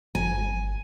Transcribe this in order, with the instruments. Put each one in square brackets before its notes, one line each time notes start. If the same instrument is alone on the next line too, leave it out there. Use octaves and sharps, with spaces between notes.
[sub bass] G1 [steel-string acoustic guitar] G#5